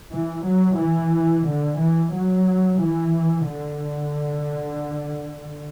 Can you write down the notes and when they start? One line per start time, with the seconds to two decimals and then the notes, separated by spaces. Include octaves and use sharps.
0.11 E3
0.45 F#3
0.78 E3
1.46 D3
1.79 E3
2.13 F#3
2.81 E3
3.47 D3